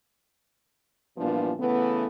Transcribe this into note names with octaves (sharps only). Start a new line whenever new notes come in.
G2 A#2 E3 F3 B3 D4
C#3 E3 A3 B3